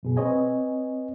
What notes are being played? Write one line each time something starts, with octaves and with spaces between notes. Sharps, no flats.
F#2 B2 G#4
C4 B4 C#5 D#5 G#5